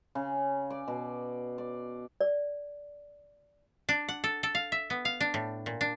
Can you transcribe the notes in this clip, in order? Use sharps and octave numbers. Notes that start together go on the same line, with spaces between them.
C#3
D5
B2
D5
D5
D4
F#5
A4
A4
F5
E5
B3
F5
D4
A2
A#2
D4